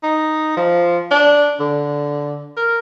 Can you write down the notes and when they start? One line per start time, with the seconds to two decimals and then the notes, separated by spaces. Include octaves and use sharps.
0.03 D#4
0.57 F3
1.11 D4
1.60 D3
2.57 A#4